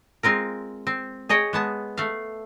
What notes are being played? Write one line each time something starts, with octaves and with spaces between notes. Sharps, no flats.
G#3 C4 F4 A#4
C4
G#4 C#5 D#5 G5
G#3 B3 A5
A3 F5